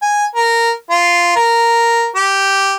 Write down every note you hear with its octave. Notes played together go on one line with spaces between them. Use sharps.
G#5
A#4
F4
A#4
G4